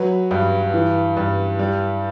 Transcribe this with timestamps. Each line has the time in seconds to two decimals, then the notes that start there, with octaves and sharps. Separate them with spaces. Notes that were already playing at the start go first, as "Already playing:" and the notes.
Already playing: F#3 B4
0.31 G2
0.74 E3
1.17 G2
1.59 G3